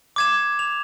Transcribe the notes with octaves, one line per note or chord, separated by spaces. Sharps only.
D6 G#6 E7
F7